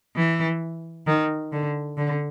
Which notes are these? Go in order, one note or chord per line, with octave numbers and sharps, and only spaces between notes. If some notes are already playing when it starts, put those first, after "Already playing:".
E3
D#3
D3
D3